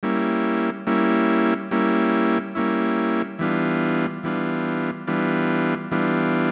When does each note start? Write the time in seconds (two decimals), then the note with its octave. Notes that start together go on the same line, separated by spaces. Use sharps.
0.03 G3 A#3 C#4 E4
0.87 G3 A#3 C#4 E4
1.71 G3 A#3 C#4 E4
2.55 G3 A#3 C#4 E4
3.39 E3 G3 B3 D4 F4
4.23 E3 G3 B3 D4 F4
5.07 E3 G3 B3 D4 F4
5.91 E3 G3 B3 D4 F4